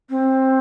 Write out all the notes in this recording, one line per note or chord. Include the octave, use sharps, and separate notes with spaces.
C4